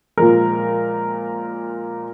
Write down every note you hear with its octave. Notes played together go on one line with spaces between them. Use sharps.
A#2 F3 G#3 A#4